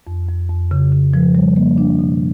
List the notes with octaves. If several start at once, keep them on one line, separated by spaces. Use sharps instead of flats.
F2
F2
F2
C#3
C#3
F3
G3
A#3
D4
B2